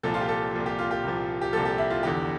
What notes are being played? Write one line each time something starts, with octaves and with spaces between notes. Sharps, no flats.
C2 A#2 F3 A4
F4
G4
A4
C2 A#2 F3
G4
F4
G4
C2 A#2 F3
G4
C2 A#2 F3 A4
G4
E4
F4
F1 E2 D3 G4